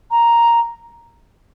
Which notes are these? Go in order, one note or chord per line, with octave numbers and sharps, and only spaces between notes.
A#5